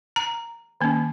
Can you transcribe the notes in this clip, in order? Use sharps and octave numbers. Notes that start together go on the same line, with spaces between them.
A#5
D#3 A#3 C#4